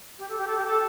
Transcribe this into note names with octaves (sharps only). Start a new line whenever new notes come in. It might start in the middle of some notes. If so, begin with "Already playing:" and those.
G4
A4
G4
A4
G4
A4